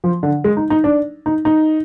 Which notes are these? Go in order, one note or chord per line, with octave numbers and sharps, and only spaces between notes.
F3
D3
G#3
D#4
D#4
D4
D#4
D#4